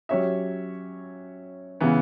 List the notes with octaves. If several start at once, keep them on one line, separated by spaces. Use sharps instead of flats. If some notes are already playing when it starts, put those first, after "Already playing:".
F#3 C#4 G4 C#5 E5
C#3 E3 B3 E4